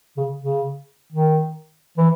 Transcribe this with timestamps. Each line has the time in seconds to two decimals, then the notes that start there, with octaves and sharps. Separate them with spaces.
0.17 C#3
0.41 C#3
1.13 D#3
1.98 E3